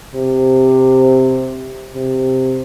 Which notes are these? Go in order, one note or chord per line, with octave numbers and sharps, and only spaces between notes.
C3
C3